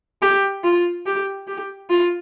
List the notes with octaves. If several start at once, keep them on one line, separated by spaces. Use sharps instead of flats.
G4
F4
G4
G4
F4